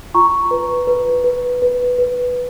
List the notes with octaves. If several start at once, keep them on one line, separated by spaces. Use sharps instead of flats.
F4 A#5 C#6
B4
B4
B4
B4
B4